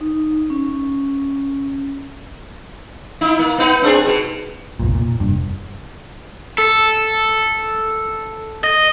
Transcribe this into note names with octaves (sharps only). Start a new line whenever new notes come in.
D#4
C#4
D#4 E4
A#3
B3 D#4 B4
C4 D4 G#4
B2
F1 B1 A#2
A#2
F1 G2
A4
D#5